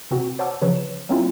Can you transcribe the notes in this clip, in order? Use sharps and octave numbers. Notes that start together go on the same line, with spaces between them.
C3 C4 F#4
C5 C#5 F#5 A5 D6 E6
C#3 F3 B4 C#5
E7
F#3 A#3 C4 C#4 E4 F4